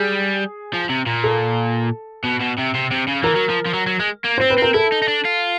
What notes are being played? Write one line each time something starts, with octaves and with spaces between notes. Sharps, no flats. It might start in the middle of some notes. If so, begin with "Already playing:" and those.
Already playing: G3 G#4
F3
C3
A#2
A4
B2
B2
C3
C3
C3
C#3
E3 A#4
F#3
F3
F3
F#3
F#3
G#3
A#3
C5
C4
B4
C4 A#4
E4 A4
D#4
D#4
D4
F4